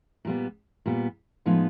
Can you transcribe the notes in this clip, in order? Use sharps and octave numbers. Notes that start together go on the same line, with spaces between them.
A#2 G3 B3
A#2 G3 B3
A2 F3 G#3 B3 D#4